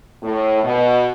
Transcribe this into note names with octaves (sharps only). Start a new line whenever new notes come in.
A2
B2